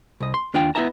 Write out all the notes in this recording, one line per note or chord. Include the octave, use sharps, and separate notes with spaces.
C2 D#5
C6
D#2 D4 F4 D5 G5
B3 E4 D#5 E5 A5 A#5